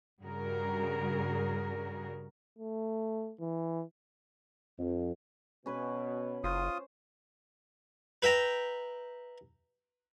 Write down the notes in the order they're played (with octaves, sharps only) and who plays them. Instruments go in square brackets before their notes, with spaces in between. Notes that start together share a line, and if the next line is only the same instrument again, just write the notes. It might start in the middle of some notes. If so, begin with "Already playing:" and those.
[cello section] G2 C#3 G3 F#4 G#4 A#4
[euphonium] A3
E3
[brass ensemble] F2
[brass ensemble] B2 [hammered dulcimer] C#4 B4 G#5
[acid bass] F#1 [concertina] F4 D#6 [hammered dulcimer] C5
[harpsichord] B4 E5 G5 A#5